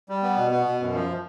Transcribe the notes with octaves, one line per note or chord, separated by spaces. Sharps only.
G3
B3
B2
B3
B2
F#2
F3